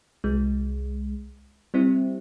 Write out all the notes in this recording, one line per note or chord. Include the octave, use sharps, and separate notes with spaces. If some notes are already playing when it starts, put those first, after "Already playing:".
C2 G#3
G3 C4 E4